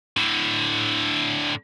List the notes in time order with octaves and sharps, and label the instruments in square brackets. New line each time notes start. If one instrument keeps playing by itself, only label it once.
[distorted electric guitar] A2 D3